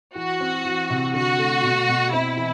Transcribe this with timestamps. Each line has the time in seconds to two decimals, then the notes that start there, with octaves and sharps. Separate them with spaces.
0.16 E3 F#4
0.41 C4
0.65 E3
0.90 C3
1.14 D3 F#4
1.39 A3
1.63 B2
1.88 B2
2.13 C4 E4
2.37 E3